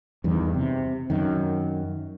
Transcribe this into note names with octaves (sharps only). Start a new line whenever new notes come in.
E2 G2 D#3
C3
F#2 D#3